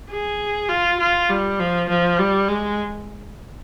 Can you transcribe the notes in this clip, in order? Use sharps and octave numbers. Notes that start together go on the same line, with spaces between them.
G#4
F4
F4
G3
F3
F3
G3
G#3